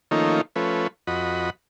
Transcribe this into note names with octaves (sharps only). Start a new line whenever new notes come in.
D#3 F3 A3 A#3 C#4 D#4
F3 A3 C#4 B4
F2 F#4 D#5 B5